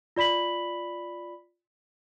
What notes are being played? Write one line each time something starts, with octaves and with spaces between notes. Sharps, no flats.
F4 D5 B5 B6 F#7